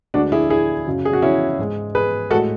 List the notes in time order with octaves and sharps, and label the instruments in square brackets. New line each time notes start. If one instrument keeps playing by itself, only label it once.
[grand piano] D2 D3 G#3 D4 F#4
E4 G#4
E4 G#4
F#2 C#3 F#3
G#4
F#4
C#4 E4
G#2 G#3
G#4 B4
G#3 F#4 A4
A2